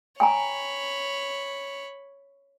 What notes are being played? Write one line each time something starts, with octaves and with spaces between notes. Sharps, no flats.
C#5 G5 G#5 A#5 B5